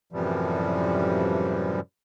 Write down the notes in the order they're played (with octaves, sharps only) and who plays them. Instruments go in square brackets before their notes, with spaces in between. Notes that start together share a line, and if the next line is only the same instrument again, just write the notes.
[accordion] F#2 A2 C3 E3 F3 G3